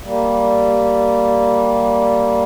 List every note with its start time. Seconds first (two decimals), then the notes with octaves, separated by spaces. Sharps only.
0.04 G3 A#3